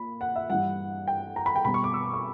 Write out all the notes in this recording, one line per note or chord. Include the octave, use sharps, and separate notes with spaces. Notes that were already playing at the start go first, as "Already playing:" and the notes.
Already playing: A#2 B5
F#5
E5
G2 E3 G3 F#5
G5
A#5
B5
G5
B2 G3 B5
C#6
D6
E6
D6
C#6